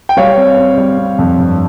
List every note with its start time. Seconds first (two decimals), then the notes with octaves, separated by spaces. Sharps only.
0.09 G5
0.17 G3 C#5 F5
0.37 C4
0.57 C4
0.77 G3
0.98 C4
1.18 F2
1.39 G2